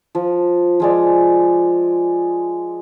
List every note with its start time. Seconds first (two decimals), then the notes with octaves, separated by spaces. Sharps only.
0.15 F3
0.80 F3 G#3 D5